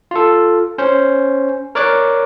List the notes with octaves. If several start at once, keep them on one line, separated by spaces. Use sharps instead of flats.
F4 A4
C#4 C5
A#4 C#5 D5 D6 F#6